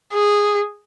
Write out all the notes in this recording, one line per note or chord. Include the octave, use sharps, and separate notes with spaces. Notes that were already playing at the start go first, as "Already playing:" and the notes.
G#4